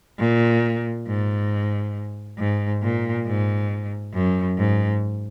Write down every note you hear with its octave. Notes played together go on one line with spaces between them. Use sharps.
A#2
G#2
G#2
A#2
G#2
F#2
G#2